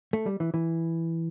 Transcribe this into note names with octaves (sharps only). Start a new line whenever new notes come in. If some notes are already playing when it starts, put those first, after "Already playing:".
A3
G3
E3
E3